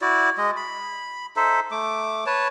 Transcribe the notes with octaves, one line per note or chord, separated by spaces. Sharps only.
E4 F#4 D5
G#3 D#5
B5
D#4 A4 C5 E5
A3 D6
B4 C#5 A5